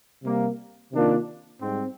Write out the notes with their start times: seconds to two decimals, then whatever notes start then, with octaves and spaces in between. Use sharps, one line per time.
0.24 C3 G3 A#3
0.92 C3 D#3 A#3 D4 F4
1.61 G#2 G3 C4